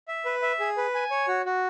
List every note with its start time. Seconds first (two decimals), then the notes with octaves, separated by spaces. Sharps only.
0.08 E5
0.25 B4
0.42 E5
0.60 G#4
0.77 B4
0.95 G#5
1.11 C#5
1.28 F#4
1.46 F#4